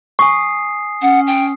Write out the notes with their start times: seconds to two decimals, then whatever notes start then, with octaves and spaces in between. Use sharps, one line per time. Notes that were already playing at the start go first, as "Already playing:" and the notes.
0.19 G#5 C#6 D#6 C7
1.02 C#4 F#5
1.27 G5